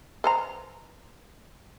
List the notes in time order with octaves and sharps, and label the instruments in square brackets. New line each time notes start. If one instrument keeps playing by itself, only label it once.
[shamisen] B4 C5 A#5